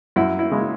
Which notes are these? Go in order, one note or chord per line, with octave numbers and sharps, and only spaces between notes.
F#2 E4
E4
C#3 G#3